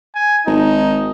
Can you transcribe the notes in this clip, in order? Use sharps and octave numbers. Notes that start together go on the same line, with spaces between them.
G#5
G#1 D#4